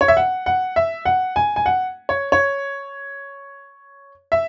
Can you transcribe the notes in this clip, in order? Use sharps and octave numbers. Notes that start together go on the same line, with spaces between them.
C#5
E5
F#5
F#5
E5
F#5
G#5
G#5
F#5
C#5
C#5
E5